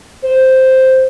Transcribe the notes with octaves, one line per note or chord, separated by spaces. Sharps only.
C5